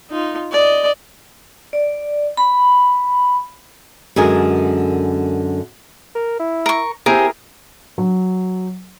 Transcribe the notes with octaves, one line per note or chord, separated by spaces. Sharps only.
D#4 F4
D5 D#5
D5
B5
F#2 D3 G#3 G#4 A#4
A#4
E4
A#4 C#6
C4 E4 G4 G#4 A#4
F#3